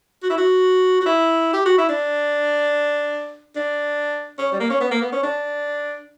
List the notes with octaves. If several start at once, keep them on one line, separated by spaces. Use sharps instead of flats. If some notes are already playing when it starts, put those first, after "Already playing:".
F#4
E4
F#4
F#4
E4
G4
F#4
E4
D4
D4
C#4
G3
A#3
C#4
B3
A#3
B3
C#4
D4